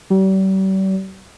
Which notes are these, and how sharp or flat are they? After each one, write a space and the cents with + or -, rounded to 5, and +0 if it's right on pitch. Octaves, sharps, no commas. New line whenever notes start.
G3 -40